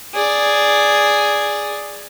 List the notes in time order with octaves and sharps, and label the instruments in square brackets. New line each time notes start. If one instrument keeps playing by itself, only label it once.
[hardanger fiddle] G#4 D5